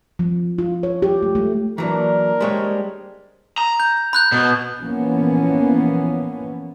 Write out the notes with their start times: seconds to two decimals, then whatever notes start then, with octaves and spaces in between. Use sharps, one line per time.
0.19 F3
0.58 F4
0.83 C#5
1.02 G4
1.22 A3
1.35 A3
1.78 E3 F#3 A#3 D4 A#4
2.40 G3 G#3 C5 C#5 G5
3.58 A#5
3.80 G6
4.13 B5 F#6 G6
4.32 B2
4.82 E3 F3 A#3 B3 C#4